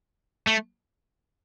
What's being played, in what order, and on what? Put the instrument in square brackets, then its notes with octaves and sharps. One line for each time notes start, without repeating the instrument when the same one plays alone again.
[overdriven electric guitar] A3